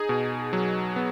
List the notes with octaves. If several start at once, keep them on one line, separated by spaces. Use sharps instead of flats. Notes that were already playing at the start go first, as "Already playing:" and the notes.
Already playing: D#4 G#4
B2
F#3
B3